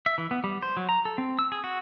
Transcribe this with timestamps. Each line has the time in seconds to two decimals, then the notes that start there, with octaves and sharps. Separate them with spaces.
0.06 E5
0.18 E3
0.31 B3
0.44 G3
0.62 C5
0.77 F#3
0.89 A#5
1.05 A4
1.18 C4
1.39 E6
1.52 G#4
1.64 F#4